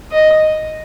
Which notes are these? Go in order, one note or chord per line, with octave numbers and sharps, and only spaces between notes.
D#5